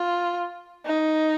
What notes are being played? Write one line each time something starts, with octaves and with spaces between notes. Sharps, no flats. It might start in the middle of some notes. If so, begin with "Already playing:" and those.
Already playing: F4
D#4